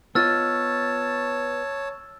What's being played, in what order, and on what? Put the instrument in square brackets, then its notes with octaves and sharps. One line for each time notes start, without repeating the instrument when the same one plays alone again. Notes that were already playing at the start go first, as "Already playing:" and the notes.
[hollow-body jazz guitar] B3 F4 D#5 [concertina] C#5 A5 [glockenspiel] E6 F6 A6